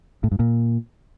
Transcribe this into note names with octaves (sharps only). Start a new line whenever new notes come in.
A2
G2
A#2